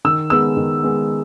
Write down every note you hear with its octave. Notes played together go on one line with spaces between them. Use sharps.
D#3 E6
G#3 B3 E6
D#3
G#3 B3